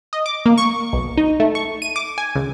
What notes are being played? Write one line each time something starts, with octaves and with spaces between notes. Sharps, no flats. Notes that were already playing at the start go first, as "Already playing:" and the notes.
D#5
D6
A#3
C#6
B1
D#4
A3
C#6
D#7
D6
G#5
C#2